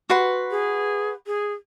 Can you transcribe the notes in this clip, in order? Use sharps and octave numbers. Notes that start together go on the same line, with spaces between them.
F#4 B4 C6
G#4
G#4